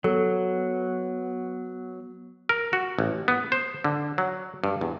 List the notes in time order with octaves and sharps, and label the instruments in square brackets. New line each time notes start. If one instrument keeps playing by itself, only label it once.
[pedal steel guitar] F#3 [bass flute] B3 [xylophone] A4
[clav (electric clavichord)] A#4
F#4
A1
B3
C5
D3
F#3
G2
E2